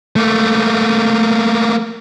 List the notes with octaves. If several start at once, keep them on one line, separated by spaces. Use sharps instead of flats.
A3 A#3